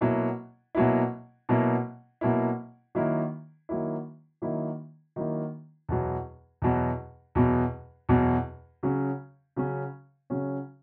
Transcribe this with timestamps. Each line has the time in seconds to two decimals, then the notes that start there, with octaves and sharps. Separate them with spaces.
0.01 B2 F#3 A#3 E4
0.75 B2 F#3 A#3 E4
1.49 B2 F#3 A#3 E4
2.21 B2 F#3 A#3 E4
2.95 D#3 F#3 A#3 E4
3.69 D#3 F#3 A#3 E4
4.42 D#3 F#3 A#3 E4
5.16 D#3 F#3 A#3 E4
5.89 E2 B2 F#3
6.62 E2 B2 F#3
7.35 E2 B2 F#3
8.09 E2 B2 F#3
8.83 C#3 F#3 C#4
9.56 C#3 F#3 C#4
10.30 C#3 F#3 C#4